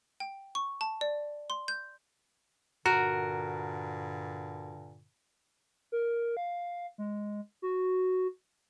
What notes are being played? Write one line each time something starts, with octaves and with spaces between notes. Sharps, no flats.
G5
C#6
A5
D5
C6
G6
G2 A#2 D3 F#4 A#4
A#4
F5
G#3
F#4